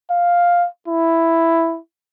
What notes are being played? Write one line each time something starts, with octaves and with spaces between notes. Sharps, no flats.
F5
E4